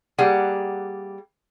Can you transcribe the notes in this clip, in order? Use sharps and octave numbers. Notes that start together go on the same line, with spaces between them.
G3 A#3 G#4 F#5